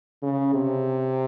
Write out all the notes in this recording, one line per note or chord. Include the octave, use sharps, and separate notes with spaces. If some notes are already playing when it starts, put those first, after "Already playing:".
C#3
C3